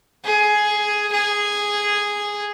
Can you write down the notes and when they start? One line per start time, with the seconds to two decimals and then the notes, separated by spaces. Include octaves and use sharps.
0.24 G#4
1.12 G#4